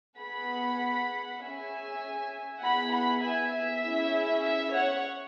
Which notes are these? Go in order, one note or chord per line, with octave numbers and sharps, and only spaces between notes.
B3 G#4 F#5 B5
C#4 G#4 E5 G#5
B3 E4 G#4 F#5 B5
F#5 B5
E5 G#5
E5
C#4 E4 G#4
E5
C#5 F#5